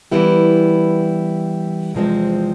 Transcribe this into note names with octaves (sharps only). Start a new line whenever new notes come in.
E3 G3 B3 E4 G4
E2 C3 F3 G#3 C4